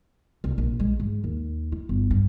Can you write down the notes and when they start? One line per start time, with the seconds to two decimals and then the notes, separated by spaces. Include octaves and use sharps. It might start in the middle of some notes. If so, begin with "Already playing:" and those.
0.44 C2
0.58 A#1
0.80 G#3
1.00 G#2
1.24 D#2
1.72 E4
1.89 G1
2.11 G2